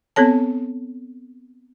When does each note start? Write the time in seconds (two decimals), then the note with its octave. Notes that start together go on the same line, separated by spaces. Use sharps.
0.16 B3 C4 A4 C#5 A5